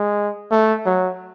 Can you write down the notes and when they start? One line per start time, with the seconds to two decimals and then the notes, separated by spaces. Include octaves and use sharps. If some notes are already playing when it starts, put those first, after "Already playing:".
Already playing: G#3
0.52 A3
0.86 F#3